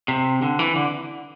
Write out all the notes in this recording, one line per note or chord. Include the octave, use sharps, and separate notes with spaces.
C3
D3
E3
D3